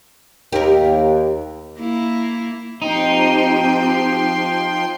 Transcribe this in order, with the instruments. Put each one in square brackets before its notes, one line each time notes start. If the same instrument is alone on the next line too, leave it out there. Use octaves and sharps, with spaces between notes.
[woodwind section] D#2 [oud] G4 A#4
[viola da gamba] A#3 E4
[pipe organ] F3 G5 C6 [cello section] C4 G4 C5 [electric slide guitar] D#4